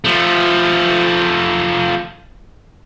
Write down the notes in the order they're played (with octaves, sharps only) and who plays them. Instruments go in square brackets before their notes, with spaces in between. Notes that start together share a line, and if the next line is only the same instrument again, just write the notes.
[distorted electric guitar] F3 A3